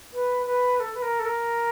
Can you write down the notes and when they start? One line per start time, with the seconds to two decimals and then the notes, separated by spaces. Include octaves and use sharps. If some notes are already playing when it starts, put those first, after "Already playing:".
0.13 B4
0.46 B4
0.80 A4
0.95 B4
1.02 A#4
1.20 A4
1.25 A#4